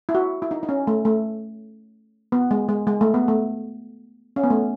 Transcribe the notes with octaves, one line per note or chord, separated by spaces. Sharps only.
E4
F#4
E4
D#4
D#4
C#4
A3
A3
B3
G#3
G#3
G#3
A3
B3
A3
C#4
B3
A3